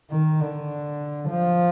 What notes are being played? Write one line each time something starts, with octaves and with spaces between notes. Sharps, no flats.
D#3
D3
F3